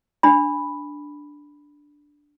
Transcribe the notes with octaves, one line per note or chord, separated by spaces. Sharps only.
D4 B5